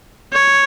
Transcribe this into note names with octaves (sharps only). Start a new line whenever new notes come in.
C#5